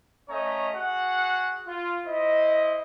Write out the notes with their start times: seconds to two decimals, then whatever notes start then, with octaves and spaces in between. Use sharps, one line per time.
0.29 A3 C#4 C#5 D#5 A#5
0.75 F#4 G#4 F#5
1.67 F4
2.06 E4 C5 D#5